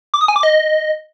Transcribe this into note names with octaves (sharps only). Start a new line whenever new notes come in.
D6
D#6
G#5
D6
D#5